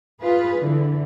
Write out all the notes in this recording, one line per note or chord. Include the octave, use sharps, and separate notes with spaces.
F4 G#4 B4
D3 E3